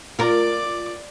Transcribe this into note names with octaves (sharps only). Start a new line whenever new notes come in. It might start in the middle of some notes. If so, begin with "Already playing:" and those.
F4 A#4 D5 D6